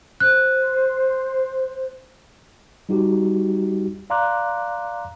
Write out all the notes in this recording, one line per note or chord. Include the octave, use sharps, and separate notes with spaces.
C5 F#6
G3 D#4 F#4 G4
D5 F5 A#5 C6 D6 F#6